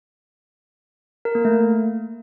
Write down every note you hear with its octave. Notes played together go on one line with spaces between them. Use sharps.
A#4
A#3
A3